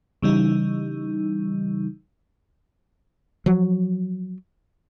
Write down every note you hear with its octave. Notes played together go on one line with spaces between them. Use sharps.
C#3 E3 G3 D#4
F3 F#3